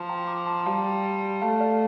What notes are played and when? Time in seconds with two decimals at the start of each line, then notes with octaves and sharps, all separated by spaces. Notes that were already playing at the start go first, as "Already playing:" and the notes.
Already playing: F3 A5 C6
0.09 G5 A#5
0.27 A#5 D6
0.46 A5 C6
0.66 G3 F5 A5
1.42 A3 F5 A5
1.60 D5 F5